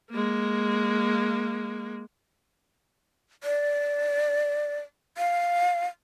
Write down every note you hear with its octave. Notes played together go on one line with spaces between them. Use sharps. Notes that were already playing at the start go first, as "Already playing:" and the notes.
G#3 A#3
D5
F5